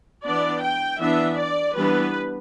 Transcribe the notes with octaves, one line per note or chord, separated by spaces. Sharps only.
E3 B3 D4 D5
G5
E3 B3 D4 E5
D5
E3 G3 B3 D4 B4